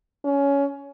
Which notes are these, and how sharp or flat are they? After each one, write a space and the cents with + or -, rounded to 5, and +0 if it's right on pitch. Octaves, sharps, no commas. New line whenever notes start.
C#4 +15